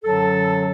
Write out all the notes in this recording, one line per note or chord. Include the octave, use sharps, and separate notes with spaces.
F#2 D3 F#3 A4